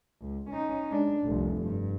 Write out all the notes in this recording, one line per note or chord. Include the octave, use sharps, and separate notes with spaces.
C#2
C#4 D#4
G#3 D4
F1 C2
G2